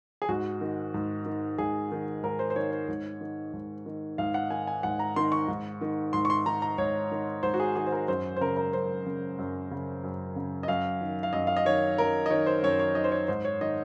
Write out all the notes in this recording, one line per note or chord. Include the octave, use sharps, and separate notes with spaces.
G#4
G#2 F#4
D#3
G#2
D#3
G#2 G#4
D#3
G#2 A#4
C5
C5
D#3 C#5
C#5
G#2
D#3
G#2
D#3
G#2 F5
F#5
D#3 G#5
G#5
G#2 F#5
A#5
D#3 C6
C#6
G#2
D#3
G#2 C6
C#6
C6
D#3 A#5
A#5
G#2 C#5
D#3
G#2 C5
F#4
G#4
D#3 G#4
C5
A#4
F#2 C5
C5
C#3 A#4
A#4
F#2 C5
C#3
F#2
C#3
F#2
C#3
D#5
F#2 F5
D#3
F5
F#2 D#5
F5
D#5
D#3 C#5
F#2 A#4
D#5
D#3 C#5
C5
F#2 C#5
C#5
D#3 D#5
C5
C#5
G#2 C5
C#5
D#3 D#5